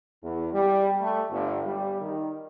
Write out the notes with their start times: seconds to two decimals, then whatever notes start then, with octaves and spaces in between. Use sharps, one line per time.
0.23 E2
0.53 G3
1.01 A3
1.30 G1
1.66 G3
2.01 D#3